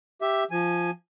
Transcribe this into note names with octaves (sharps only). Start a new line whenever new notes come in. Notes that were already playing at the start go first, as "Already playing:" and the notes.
G4 E5
F3 G#5